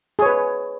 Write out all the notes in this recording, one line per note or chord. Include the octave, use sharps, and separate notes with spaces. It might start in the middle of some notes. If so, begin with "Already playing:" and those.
G#4 B4 C#5